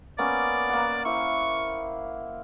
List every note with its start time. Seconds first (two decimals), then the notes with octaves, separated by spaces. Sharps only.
0.19 A#3 B3 C#4 D5
0.69 A#3 F#5
1.05 E4 C5 C#6